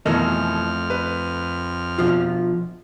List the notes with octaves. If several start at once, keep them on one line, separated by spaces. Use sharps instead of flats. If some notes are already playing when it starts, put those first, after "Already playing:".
F2 B2 E3 A3 A#4 D#5 F6
B4
B2 F3 F4